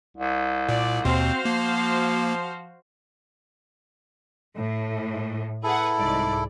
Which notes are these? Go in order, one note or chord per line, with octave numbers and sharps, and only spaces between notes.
C2
A#2 D5
D#2 B2 C4 F#4 C5 F5
F3 A#3
A2
E4 G#4 A4 B4 F#5
C2 G#2 D5